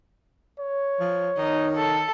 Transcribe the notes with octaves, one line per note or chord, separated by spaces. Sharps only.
C#5
F3
D#3 D#4
A4